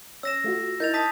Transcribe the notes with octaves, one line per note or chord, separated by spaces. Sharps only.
C#4 E6 A#6 E7
A3 F4 F#4
D#4 E4 A#4 G6 A6 F7
A5 D#6 B6